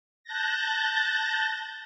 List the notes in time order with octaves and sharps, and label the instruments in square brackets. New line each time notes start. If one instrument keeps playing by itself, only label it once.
[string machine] A5 F#6 G6 A6 A#6